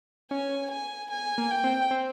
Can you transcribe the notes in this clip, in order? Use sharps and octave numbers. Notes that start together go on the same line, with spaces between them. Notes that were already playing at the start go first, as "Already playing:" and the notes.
C#4 G#5
G#5
G#5
A#3
G5
C4
C4